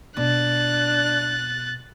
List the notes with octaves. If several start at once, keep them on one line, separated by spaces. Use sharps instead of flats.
B2 D4 F#6 A6